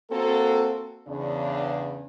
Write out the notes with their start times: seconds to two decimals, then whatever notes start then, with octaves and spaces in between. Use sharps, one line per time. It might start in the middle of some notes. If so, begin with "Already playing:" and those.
0.10 A#3 C4 F#4 A4
1.07 E2 C#3 D4